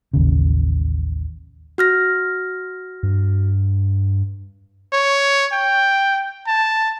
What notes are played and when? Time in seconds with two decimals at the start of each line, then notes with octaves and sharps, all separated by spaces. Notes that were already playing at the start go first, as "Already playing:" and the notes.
0.13 A1 D#2 C#3
1.78 F#4 F6 A#6
3.03 G2
4.93 C#5
5.53 G5
6.47 A5